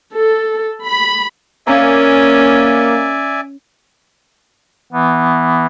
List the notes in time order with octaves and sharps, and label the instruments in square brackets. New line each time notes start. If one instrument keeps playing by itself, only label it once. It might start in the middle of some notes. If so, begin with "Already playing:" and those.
[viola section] A4
B5
[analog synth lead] A#3 [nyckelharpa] C#4 [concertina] D5 E5 G#5
[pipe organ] E3 B3